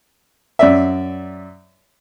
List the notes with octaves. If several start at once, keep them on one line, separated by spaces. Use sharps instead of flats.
F#2 D5 E5